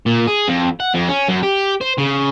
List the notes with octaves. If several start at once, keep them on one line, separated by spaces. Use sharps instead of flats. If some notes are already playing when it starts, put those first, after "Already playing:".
A#2
G#4
F2
F#5
F2
C#4
F#2
G4
C5
C#3